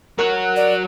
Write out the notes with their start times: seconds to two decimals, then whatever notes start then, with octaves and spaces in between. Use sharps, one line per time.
0.19 F#4 A#4 C#5 F#6
0.56 D5